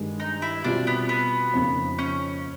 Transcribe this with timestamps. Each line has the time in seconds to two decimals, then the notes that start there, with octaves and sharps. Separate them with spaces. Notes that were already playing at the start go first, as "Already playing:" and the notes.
Already playing: G2 D#3 G#3
0.20 D#4
0.42 E4
0.64 B2 G3 C4 D4 F4
0.87 B3
1.09 B3
1.54 F2 C#3 F3 A#3 D#4
1.99 C#4